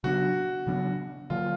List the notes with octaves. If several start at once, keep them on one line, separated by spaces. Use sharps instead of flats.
C#3 F#3 B3 D4 F#4
C#3 F#3 B3 D4
D3 F#3 A#3 F4